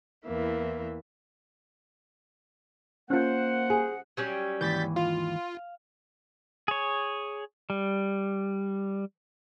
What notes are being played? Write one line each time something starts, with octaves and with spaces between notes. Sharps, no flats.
E2 E3 A#3 E5
A#3 C#4 F4 C5 F#5
G#4
F#3 G3 C#4
D#2 G#2 E3 G6 A6 B6
F4 F5
G#4 C#5
G3